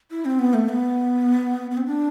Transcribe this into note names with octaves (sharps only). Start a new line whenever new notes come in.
E4
C4
B3
A3
B3
B3
C4
D4